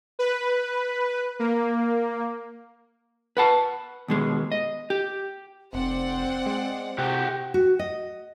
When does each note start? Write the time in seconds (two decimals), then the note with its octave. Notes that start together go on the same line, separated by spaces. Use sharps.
0.19 B4
1.39 A#3
3.37 B4 F#5 A5
4.08 D#2 B2 G#3
4.52 D#5
4.90 G4
5.73 F1 C4 C5 D5 F#5
6.46 G#3
6.98 C3 F#4 G4
7.54 F#4
7.79 D#5